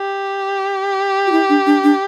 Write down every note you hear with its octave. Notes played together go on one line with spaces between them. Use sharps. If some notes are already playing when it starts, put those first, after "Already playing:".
Already playing: G4
F#4
E4
D4
D4
D4